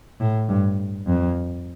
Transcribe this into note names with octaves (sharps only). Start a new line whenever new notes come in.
A2
G2
F2